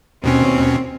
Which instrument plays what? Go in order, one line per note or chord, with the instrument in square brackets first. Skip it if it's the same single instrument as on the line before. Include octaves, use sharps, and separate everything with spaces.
[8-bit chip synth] D#2 B2 C#4 [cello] C4